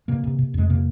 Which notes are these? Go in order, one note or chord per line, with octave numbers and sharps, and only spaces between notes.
C3 A#3
C3
C3
F2 G#3
C3 A#3